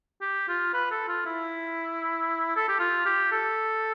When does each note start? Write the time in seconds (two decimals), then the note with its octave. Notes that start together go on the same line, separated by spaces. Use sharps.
0.21 G4
0.48 F4
0.74 B4
0.91 A4
1.08 F4
1.25 E4
2.56 A4
2.69 G4
2.79 F4
3.06 G4
3.32 A4